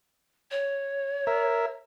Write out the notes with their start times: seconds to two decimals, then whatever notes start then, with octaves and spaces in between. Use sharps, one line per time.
0.51 C#5
1.27 A#4 E5